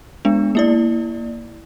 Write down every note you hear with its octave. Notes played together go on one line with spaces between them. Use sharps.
G#3 B3 D4
A#3 E4 D5